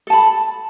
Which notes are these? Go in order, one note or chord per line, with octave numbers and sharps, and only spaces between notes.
A4 A5 B5